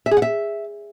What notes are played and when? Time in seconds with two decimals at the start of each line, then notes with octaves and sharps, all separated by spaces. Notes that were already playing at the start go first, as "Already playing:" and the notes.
0.06 E5
0.11 G#4
0.17 F#5
0.22 E5